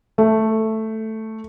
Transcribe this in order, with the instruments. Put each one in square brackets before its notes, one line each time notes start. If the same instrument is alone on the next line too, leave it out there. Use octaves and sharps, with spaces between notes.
[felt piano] A3